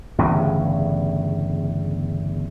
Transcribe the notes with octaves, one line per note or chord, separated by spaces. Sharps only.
G1 E2 A2 C#3